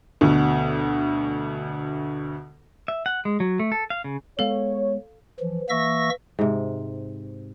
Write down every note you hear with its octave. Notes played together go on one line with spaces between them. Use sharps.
D2 B2
E5
F#5
G#3
F#3
A3
A4
F5
C#3
G#3 B3 A4 C#5 F5
E3 F3
E3 A#3 E5 C#6 E6 A#6
G#2 C3